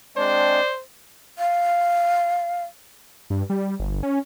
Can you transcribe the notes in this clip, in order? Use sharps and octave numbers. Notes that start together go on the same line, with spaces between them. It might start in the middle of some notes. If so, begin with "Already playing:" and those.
G#3 C4 D4 C5 D5
F5
G2
G3
G1
C#4